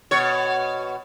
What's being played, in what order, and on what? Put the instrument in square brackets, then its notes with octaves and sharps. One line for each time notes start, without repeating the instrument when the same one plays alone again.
[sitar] B2 C#5